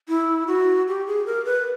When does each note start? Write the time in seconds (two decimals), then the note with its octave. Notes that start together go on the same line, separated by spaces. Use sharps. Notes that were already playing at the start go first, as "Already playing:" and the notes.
0.08 E4
0.47 F#4
0.87 G4
1.07 G#4
1.26 A#4
1.45 B4